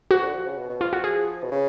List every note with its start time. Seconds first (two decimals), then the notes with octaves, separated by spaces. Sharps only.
0.10 F3 F#4
0.23 D3
0.34 F3
0.46 C#3
0.57 B2
0.69 B2
0.81 F3 F4
0.93 F#4
1.04 G#4
1.44 B2
1.51 C#3